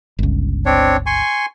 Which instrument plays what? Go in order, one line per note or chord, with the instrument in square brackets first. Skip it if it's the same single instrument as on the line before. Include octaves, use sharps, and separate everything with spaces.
[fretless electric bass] G1 C#2
[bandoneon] C4 D4 C#5
G#5 C6 C#6